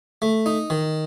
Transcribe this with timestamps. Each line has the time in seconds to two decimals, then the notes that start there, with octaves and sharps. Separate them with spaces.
0.22 A3
0.46 D#4
0.70 D#3